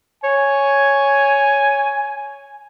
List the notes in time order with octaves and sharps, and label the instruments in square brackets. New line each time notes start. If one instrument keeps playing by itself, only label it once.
[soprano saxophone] C#5 [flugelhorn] G#5